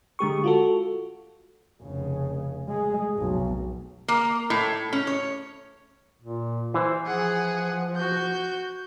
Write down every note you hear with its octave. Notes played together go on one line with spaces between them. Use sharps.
D3 G#3 G4 C#6
F4 F#4 A4
F1 C#3
G#3
F1 B1
A#3
A2
C#4
C#5
A#2
E3 E4 C5
F3 G#4 F#5
F#4 G6